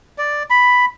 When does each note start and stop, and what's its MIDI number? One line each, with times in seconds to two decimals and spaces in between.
0.18 0.43 74
0.50 0.85 83